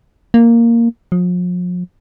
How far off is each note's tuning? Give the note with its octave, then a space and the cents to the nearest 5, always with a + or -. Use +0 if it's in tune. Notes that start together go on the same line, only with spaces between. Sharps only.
A#3 -5
F3 +40